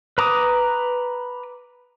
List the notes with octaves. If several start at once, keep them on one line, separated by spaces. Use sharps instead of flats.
B4 A#5 D6 D#6